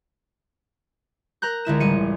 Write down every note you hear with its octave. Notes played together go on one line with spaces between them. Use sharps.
A#4 A#5 F#6 G6
C#2 D3 E4 E7
A1 G3 C#7 D#7